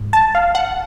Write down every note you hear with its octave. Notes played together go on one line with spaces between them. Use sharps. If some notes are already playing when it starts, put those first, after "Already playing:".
Already playing: G#2
A5
F5
F#5